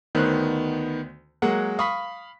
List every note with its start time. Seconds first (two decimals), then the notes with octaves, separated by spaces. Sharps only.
0.15 D2 D#3 B3 C5 F#6
1.42 F#3 G#3 A#3 F#5
1.79 F5 B5 C#6 D#6 B6